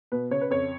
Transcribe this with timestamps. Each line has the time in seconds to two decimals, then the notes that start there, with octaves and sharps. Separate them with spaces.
0.12 B2 B4
0.31 C#3 C#5
0.41 B4
0.50 F2 C#5